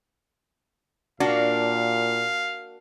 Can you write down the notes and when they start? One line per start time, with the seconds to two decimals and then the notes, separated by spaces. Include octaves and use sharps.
1.20 A#2 A#3 D4 F#4 F5